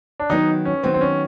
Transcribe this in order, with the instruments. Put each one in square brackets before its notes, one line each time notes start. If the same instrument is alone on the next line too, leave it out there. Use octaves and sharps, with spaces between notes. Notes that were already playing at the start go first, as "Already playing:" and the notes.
[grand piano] D4
[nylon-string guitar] D#3 F#3 B3 [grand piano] D#4
[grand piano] C#4
[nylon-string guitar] D#3 F#3 B3 [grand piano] C4
[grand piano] C4
C#4